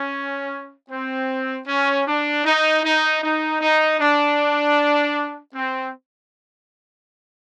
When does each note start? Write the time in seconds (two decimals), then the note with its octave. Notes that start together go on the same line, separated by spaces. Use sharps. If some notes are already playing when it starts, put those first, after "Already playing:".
Already playing: C#4
0.90 C4
1.67 C#4
2.06 D4
2.45 D#4
2.84 D#4
3.22 D#4
3.61 D#4
4.00 D4
5.54 C4